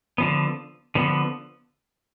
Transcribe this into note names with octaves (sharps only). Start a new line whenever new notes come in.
D3 F3 B3
D3 F3 B3